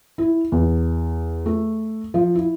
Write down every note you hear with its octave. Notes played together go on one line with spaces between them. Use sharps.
E4
E2
A3
F3
E4